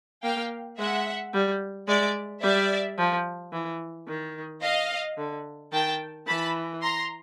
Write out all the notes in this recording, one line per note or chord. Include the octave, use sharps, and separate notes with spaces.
A#3 F5 G5
G#3 E5 F#5
G3
G#3 D5 E5
G3 D5 E5
F3
E3
D#3
D#5 F5
D3
D#3 G5 A5
E3 A5 B5
A#5 C6